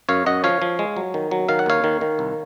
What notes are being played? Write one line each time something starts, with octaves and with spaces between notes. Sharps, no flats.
F#2 C#5 F5
F#2 D#5 F#5
F3 C#5 F5
F3
G#3
F#3
D#3
F#3
D#3 F5
F#5
D#2 C#5 F5
D#3
D#3
C2